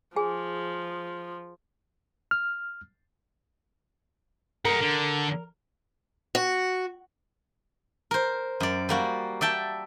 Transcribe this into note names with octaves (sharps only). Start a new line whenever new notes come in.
F3 G#4 G#5
F6
G#4 A#4 F#5
D3
F#4
A#4 C5
F#2 D5
G3 A#3 F#4
D5 E5 G5 A5